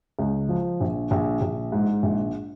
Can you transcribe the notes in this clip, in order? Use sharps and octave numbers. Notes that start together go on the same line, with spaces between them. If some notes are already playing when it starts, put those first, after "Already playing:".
C#2
F3
A#1
A#1
A#1
G#2
A#1